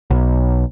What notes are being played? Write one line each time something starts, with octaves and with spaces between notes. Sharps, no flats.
B1